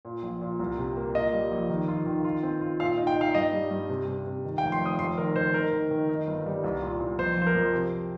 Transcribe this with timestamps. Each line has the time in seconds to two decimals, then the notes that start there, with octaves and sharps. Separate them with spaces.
0.05 A#2
0.23 A#1
0.41 A#2
0.59 C2
0.78 C3
0.97 A#3
1.15 A#2 D#5
1.33 G3
1.51 A#1
1.70 D#3
1.88 F4
2.06 D#3
2.24 F4
2.43 C4
2.61 F4
2.79 A#2 F5
2.98 D#4
3.07 G5
3.16 D#4 F5
3.35 G2 D#5
3.53 G3
3.71 G2
3.89 C3
4.08 C3
4.26 C3
4.44 D#3
4.58 G5
4.63 F1
4.72 C6
4.81 F1 D#6
4.99 F1 C6
5.17 D#3 A#4
5.36 D#3 C5
5.54 D#4 A#4
5.73 D#3
5.91 D#3
6.09 D#4
6.27 G1
6.46 G3
6.64 C2
6.82 A#2
7.00 C2
7.19 F2 C5
7.37 F3 C5
7.47 A#4
7.55 F2
7.74 C3